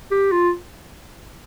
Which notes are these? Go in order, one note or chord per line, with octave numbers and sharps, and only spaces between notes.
G4
F4